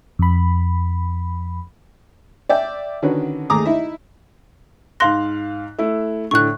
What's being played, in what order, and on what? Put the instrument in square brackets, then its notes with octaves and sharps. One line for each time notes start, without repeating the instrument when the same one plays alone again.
[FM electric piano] F2 B5
[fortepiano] D5 E5 G5
D3 D#3 C#4 F#4 B4
D#2 A3 G#4 A#5 D6 D#6
D#4 E4 E5
[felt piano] G#2 F5 F#6 [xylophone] C6 A#6
[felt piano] A3 E4
[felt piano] A2 D3 [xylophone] C#6 F#6